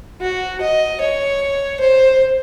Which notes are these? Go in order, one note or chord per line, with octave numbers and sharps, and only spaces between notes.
F#4
D#5
C#5
C5